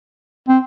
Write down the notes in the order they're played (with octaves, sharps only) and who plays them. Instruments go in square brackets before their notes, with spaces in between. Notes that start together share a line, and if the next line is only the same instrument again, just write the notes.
[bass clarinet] C4